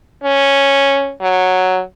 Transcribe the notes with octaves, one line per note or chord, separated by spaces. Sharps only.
C#4
F#3